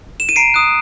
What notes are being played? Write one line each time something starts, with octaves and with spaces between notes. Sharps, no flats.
E7
D#7
A#5 C7 D7
D#6 F#6